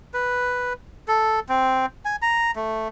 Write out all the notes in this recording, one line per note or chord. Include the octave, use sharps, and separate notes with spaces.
B4
A4
C4
G#5
A#5
A3